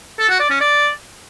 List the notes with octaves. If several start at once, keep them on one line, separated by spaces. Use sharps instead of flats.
A4
F#4
D5
C#4
D5